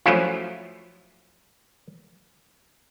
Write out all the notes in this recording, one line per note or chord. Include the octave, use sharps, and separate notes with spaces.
F3 F#3 A3 C#4 E4 F4